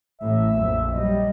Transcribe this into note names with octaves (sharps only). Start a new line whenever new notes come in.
A1 A2 E5
A#1 F2 F#3
F#3 G3 D#5